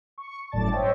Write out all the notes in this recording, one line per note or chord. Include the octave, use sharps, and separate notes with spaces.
C#6
G1 F#2 A2 D5 A5 A6
C5 C#5 D#5 E5 G5